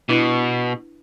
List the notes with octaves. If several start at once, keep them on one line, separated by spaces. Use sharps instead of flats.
B2 D4 E4 B4